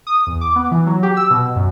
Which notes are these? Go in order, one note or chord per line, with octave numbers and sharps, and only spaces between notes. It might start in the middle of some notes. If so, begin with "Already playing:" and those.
D#6
E2
D6
B3
E3
F#3
G4
E6
B2
F#2